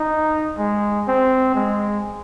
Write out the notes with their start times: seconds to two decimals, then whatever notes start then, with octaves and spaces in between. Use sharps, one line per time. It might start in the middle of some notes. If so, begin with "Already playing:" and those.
Already playing: D#4
0.58 G#3
1.08 C4
1.55 G#3